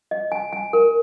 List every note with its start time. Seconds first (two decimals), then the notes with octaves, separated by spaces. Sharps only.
0.11 D#5
0.32 G#5
0.53 G#5
0.73 A#4